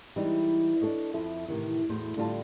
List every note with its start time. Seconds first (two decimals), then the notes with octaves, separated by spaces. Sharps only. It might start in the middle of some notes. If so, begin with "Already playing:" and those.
0.16 E3 G3 G#3 C4 D#4
0.81 D4 D#4 A4 C#5 D#5
1.14 F2 F3 C4 E4 A4 E5
1.48 A2 C3 D#3 E3
1.89 E2 A2 A3 F#4 B4 C5
2.17 A2 D3 G3 C4 F4 A5